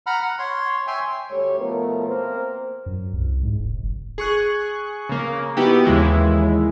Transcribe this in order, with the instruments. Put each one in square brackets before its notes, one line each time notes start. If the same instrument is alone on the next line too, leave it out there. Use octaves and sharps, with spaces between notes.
[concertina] F#5 A#5 B5 F6
F#5
C#5 C6
C#5 E5 G5 G#5 C6
[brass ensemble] D2 G3 A3 C#5
B2 F3 A3 B3 A#4
A#3 C4 A#4 C5
[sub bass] F#2
C2
G#2
E1
F#1
[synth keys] G#4 C#6 F#6
C#3 A#3
B3 D#4 E4 F#4 G4
D#2 C#3 E3 G#3 E4